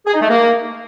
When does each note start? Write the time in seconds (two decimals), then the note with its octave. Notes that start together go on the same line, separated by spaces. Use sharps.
0.07 G#4
0.14 D#4
0.21 A3
0.29 A#3